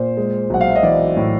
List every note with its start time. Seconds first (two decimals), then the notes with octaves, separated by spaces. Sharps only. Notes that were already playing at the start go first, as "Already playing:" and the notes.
Already playing: A#2 C5
0.17 G#3
0.50 B1 F#5
0.61 F5
0.69 E5
0.76 D#5
0.83 E3 D5
1.16 A2